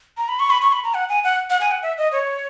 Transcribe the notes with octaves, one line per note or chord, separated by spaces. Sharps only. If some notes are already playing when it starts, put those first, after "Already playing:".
A#5
B5
C#6
B5
C#6
B5
A#5
F#5
G#5
F#5
F#5
G#5
F#5
E5
D#5
C#5